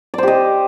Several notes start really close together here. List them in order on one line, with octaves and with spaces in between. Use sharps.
D5 C5 G4 D#5